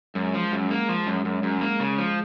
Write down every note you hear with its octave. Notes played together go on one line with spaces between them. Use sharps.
F#2 G#3
F3
F#2
A#3
F3
F#2
F#2
F#2
G#3 A#3
C#3
F3